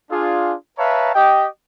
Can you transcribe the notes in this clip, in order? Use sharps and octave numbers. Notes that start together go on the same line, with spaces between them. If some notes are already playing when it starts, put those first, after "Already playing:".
D4 F4 G#4
B4 C#5 E5 F5 A5 A#5
G4 D#5 G5